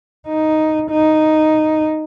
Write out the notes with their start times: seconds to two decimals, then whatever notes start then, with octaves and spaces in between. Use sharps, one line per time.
0.27 D#4
0.90 D#4